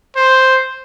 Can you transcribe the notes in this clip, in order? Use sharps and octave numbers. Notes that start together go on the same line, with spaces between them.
C5